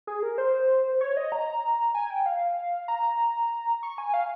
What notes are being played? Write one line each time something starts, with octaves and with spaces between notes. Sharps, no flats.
G#4
A#4
C5
C#5
D#5
A#5
G#5
G5
F5
A#5
C#6
G#5
F5